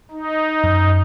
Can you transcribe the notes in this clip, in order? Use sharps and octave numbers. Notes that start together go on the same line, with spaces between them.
D#4
F#2